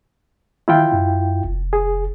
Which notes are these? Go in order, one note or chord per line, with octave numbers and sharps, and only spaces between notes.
D#3 E4 F4 G5
F#2
F1
G#4